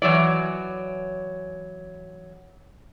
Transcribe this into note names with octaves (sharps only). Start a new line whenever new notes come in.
E3 F#3 C#5 D5